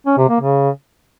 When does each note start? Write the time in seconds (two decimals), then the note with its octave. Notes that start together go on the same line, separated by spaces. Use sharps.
0.06 C#4
0.18 C3
0.29 A#3
0.41 C#3